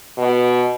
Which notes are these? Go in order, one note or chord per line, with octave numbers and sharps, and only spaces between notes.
B2